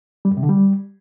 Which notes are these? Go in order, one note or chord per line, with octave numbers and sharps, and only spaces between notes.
G3
F#2
C3
D3
G3